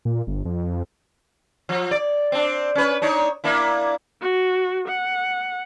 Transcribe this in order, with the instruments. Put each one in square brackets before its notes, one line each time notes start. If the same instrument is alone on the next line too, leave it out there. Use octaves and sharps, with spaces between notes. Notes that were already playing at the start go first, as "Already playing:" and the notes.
[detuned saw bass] A#2
G1
F2
[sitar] F3
D5
C4 D4
C#4 B4
D4 D#4 C#5
A#3 D4 E4
[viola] F#4
F#5